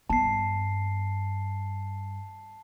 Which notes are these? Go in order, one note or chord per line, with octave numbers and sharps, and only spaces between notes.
G2 B3 A5 C7